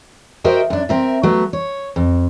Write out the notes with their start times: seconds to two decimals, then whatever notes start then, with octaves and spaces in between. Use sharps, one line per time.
0.44 F#4 A#4 C5 D#5 E5 G5
0.70 F#2 D4
0.89 C4 A#4 E5
1.23 F#3 A3 B3
1.53 C#5
1.96 F2